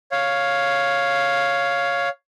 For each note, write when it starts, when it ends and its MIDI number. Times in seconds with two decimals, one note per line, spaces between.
0.12 2.09 73
0.12 2.09 77